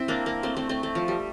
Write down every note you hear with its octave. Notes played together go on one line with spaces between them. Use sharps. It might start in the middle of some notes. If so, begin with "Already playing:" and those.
Already playing: C4 E4
A#3 D4
A#3
A3 C4
A3 C4
A3 C4
A3
F3
G3